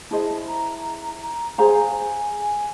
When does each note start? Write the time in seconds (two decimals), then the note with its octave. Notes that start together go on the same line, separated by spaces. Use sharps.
0.11 E4 G#4 C5 D#5 A5
0.48 A#5
0.85 A#5
1.21 A#5
1.58 G#4 C5 F5 G#5 A#5